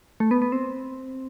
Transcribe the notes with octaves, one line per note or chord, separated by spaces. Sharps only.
A3
B3
B3
C4